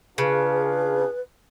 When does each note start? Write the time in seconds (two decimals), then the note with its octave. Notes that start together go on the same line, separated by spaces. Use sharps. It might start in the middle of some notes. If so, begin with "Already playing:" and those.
0.18 C#3 D4 F4 G#4 B4